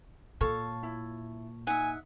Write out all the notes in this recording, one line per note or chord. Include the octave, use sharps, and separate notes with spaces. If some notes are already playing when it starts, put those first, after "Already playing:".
A#2 A4 C#5 F5 A5
E4
D#4 E5 F#5 G#5